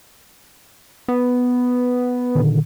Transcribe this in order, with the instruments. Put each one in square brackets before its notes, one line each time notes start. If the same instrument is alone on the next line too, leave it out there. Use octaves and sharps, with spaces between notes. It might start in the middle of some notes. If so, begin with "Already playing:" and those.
[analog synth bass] B3
[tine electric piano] A#2 D3 D#3